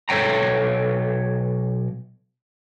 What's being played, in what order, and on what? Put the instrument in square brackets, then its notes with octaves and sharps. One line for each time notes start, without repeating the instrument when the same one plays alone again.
[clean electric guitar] B1 A4 C#5 G5 A#5